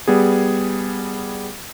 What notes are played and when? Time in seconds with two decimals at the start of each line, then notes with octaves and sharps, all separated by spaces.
0.08 G3 B3 G#4